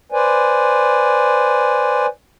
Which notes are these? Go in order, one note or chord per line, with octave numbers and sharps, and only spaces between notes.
B4 C5 D5 G#5